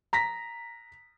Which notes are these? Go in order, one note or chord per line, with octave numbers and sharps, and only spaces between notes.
A#5 A#6 B6